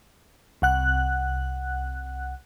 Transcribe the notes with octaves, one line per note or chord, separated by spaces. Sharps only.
C2 F#5 F#6